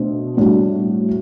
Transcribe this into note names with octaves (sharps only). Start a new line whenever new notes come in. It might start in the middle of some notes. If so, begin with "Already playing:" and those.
Already playing: B2 A3 D4 C5
A2 G3 D4 F#4